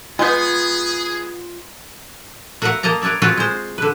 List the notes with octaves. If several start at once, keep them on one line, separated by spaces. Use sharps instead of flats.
G#3 B3 F4 G#4 G6
F#4 A#4 B4 E5 F#5
A#3 D#5 A5 A#5
A#4 B4 C#5 D5 E5
C4 F4 F#4 G#4 B4
G#3 C5
D3 B4